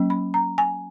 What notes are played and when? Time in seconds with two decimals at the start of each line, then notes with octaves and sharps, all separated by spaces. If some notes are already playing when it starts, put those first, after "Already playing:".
Already playing: F#3 A#3 C#4
0.10 B5
0.34 A#5
0.58 G#5